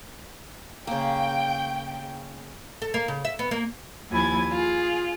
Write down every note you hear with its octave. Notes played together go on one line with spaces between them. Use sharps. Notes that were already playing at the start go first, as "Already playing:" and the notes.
C#3 A#3 G5
A4
A#3
C#3
E5
B3
A#3
D#2 F3 E4 G#5 G#6 A6
F4 G#4